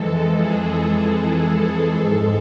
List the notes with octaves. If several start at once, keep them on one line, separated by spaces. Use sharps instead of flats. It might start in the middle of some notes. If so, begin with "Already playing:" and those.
Already playing: F2 E3 G#3 A4
G#4
A4
G#2 G#3